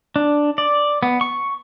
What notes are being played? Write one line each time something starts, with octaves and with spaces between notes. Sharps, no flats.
D4
D5
B3
C#6